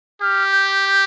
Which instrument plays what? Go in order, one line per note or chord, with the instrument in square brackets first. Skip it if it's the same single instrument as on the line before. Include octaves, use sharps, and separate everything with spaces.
[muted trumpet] G4 [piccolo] F6
[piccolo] G6
G6